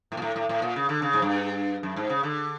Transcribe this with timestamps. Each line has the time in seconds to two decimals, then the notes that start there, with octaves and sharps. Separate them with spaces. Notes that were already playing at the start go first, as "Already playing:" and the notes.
0.12 A2
0.17 A#2
0.22 A2
0.36 A2
0.49 A2
0.62 A#2
0.76 C#3
0.89 D3
1.02 C#3
1.13 G#2
1.22 G2
1.83 F#2
1.96 G#2
2.10 C#3
2.23 D3